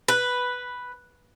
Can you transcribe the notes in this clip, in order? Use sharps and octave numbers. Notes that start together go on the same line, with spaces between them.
B4